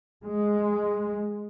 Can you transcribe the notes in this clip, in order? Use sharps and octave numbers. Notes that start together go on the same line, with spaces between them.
G#3